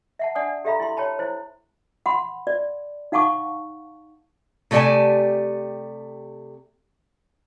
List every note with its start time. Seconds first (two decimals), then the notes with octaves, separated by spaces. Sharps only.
0.19 E5 F#5 A5
0.35 D4 D5 F#5 G#5 D#6
0.65 G4 A4 E5 F5 A#5 B5
0.80 E4 G4 C6
0.97 C#5 G5 A5 B5
1.19 E4 C5
2.06 F#5 B5 C6
2.47 D5
3.12 D#4 F5 F#5 A5 C#6 D6
4.71 C3 A3 G4 D5 G#5 A5